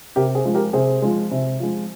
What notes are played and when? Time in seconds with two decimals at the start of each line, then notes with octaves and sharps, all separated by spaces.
0.16 C3 G4 A#4
0.35 G#4 C5
0.45 F3 G#3
0.54 G4 A#4
0.73 C3 G#4 C5
1.02 F3 G#3
1.31 C3
1.60 F3 G#3